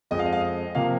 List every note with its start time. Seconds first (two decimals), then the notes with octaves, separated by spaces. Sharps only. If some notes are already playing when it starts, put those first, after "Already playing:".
0.11 F2 F3 G#3 D#5
0.19 F5
0.26 D#5
0.33 F5
0.40 D#5
0.75 C3 F3 A#3 F5